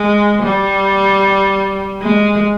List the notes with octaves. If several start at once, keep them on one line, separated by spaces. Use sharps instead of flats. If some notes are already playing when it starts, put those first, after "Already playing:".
Already playing: G#3
G3
G#3